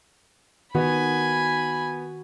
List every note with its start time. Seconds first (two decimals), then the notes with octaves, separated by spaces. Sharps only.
0.75 D#3 B3 F#4 G#5 B5